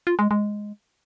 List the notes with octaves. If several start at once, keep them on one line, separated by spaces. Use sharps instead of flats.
F4
G#3
G#3